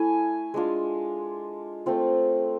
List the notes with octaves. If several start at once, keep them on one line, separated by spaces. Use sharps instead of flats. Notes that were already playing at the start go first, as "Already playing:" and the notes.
Already playing: A3 E4 G#5
G#3 D4 F4
A3 C4 F4